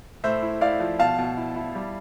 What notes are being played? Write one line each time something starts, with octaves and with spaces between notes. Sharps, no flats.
A2 C5 E5
E4
E4 D5 F5
F3
B2 F5 A5
B2
E4
E4
G3